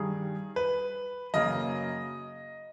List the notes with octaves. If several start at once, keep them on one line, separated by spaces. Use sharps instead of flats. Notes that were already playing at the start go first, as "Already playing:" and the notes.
Already playing: G2 D#3 G3 G#4
B4
F#2 C#3 F#3 A#3 D#5